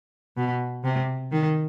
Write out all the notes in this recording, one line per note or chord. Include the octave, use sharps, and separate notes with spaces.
B2
C3
D#3